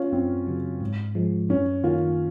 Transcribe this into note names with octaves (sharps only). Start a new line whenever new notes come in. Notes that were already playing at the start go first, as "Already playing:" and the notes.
Already playing: C#4 F4
F#2 C4
C#3 F#3
G#2
F3 G#3
F#2 C#4
D#3 A#3 C#4 F4